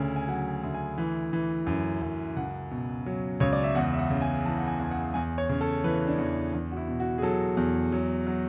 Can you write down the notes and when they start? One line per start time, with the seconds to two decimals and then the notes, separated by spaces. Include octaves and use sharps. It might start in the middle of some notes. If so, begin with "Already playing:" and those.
Already playing: D2 C#3 G#5
0.16 G#5
0.28 F#3 F#5
0.63 D2
0.74 G#5
0.98 E3
1.33 E3
1.66 F#2
2.02 F#2
2.37 C#2 F#5
2.71 B2
3.06 F#3
3.40 C#2 C#5
3.53 D5
3.64 E5
3.75 E2 F#5
3.94 E5
3.99 F#5
4.10 C#3
4.22 G#5
4.45 E3 A5
4.58 F#5
4.68 G#5
4.80 E2 G#5
4.91 F#5
5.14 E2 G#5
5.38 C#5
5.49 C#3
5.61 A4
5.84 E3 B4
6.07 D4
6.18 E2
6.53 E2 D4
6.72 F#4
6.77 E4
6.88 B2
7.00 F#4
7.18 G#4
7.22 F#3 A4
7.57 E2
7.92 F#3
8.26 F#3